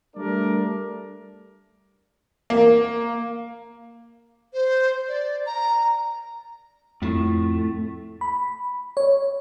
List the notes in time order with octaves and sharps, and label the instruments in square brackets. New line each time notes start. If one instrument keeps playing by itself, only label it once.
[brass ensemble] G3 A3 D4 A#4 D5
[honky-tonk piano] A#3
[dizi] C5
D5
A#5
[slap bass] F2 F3 [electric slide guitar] A2 A3
[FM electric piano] B5
C#5